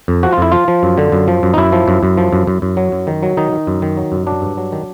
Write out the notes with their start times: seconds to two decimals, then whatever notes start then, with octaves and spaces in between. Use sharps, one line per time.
0.08 F2
0.23 F3 F#4
0.33 F4
0.38 F2 E4
0.52 F3 F4
0.68 F3
0.83 F#2
0.98 D3
1.12 F#2
1.28 F3
1.43 F#2
1.54 D#4
1.57 F#2 E4
1.72 F3
1.88 F#2
2.03 F#2
2.17 F3
2.33 F#2
2.47 F#2
2.62 F#2
2.77 F#3
2.92 F#2
3.07 D#3
3.23 F#3
3.37 D#3 D#4
3.52 D#3
3.67 F#2
3.82 D#3
3.97 F#3
4.12 F#2
4.27 F#3 D4
4.42 G2
4.57 F#3
4.72 D#3